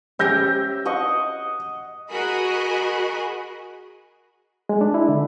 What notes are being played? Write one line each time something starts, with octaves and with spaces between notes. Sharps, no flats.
C#4 G4 E5 E6 G6 A#6
D#5 F#5 C#6
F#4 G#4 A#4 D#5 B5
G#3
D4
E4
D3